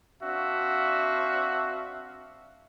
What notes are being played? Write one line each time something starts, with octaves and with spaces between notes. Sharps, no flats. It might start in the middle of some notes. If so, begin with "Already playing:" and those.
C4 D4 F#4 E5 F5